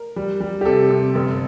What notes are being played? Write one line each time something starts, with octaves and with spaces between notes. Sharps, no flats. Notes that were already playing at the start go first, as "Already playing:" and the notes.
Already playing: A#4
G3
G3
G4
C3 A4
C3
G1